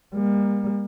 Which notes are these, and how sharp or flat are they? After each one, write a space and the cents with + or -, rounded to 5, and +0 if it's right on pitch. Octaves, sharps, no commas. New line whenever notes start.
G3 +40 A#3 +30